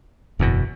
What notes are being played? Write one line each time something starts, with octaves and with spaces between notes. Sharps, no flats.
F#1 E2 B2